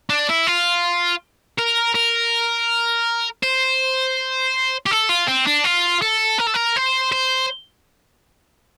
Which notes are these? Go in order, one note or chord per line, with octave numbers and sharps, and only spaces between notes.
D4
E4
F4
A#4
A#4
C5
G4
A4
F4
C4
D4
F4
A4
A#4
A4
A#4
C5
C5